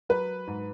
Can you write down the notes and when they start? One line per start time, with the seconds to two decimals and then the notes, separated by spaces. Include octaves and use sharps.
0.09 F#3 B4
0.47 G#2